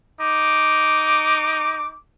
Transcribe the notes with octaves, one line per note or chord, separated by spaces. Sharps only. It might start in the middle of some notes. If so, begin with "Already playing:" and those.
D#4 D6